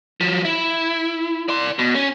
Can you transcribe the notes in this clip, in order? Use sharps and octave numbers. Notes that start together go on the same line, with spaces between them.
F3 F#3
E4
D5 C6
B2
C#4